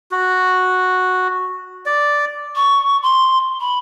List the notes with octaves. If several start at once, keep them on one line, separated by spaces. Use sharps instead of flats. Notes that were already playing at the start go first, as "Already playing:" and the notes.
F#4
D5
C#6
C6
B5